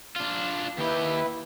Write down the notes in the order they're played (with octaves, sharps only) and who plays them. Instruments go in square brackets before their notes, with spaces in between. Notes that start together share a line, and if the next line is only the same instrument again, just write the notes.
[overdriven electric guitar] D4 F4
[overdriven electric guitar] D#2 G4 [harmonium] E4 B4